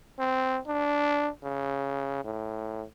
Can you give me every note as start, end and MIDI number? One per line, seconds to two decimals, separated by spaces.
0.19 0.59 60
0.67 1.30 62
1.44 2.22 49
2.25 2.84 45